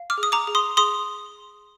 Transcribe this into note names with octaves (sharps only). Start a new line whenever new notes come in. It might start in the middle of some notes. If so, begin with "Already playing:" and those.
Already playing: F5
D6 F6
G#4
D#6
A#5 D6
G#4
C6 D#6
G#4 C6 D#6